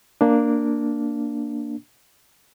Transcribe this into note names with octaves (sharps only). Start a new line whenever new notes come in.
A#3 D4